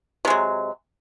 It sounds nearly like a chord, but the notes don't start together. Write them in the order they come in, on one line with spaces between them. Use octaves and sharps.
C3 G#3 F#3